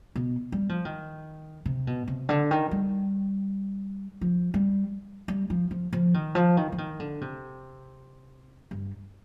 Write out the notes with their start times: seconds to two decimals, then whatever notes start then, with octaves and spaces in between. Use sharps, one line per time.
0.16 B2
0.52 G3
0.69 F3
0.85 D#3
1.66 C3
1.87 B2
2.08 C3
2.29 D3
2.51 D#3
2.71 G3
4.21 F3
4.54 G3
5.28 G3
5.50 F3
5.71 F3
5.93 F3
6.14 D#3
6.35 F3
6.57 D#3
6.72 F3
6.78 D#3
7.00 D3
7.21 C3
8.71 G2